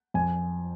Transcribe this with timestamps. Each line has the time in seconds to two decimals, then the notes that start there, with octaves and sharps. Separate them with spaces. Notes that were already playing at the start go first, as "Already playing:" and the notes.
0.14 F2 G#5